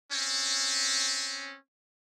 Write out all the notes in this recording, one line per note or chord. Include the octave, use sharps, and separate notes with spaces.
C4 C#4